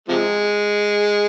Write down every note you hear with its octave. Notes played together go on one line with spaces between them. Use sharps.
C3 F3 G#3